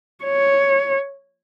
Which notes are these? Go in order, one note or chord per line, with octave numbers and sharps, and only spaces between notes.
C#5